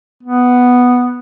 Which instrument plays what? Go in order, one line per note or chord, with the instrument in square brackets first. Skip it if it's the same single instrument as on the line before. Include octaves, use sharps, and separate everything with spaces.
[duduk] B3